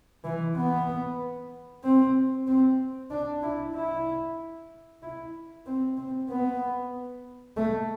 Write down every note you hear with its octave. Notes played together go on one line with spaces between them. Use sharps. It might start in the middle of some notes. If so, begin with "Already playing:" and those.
E3
B3
C4
C4
D4
E4
E4
E4
C4
C4
B3
A3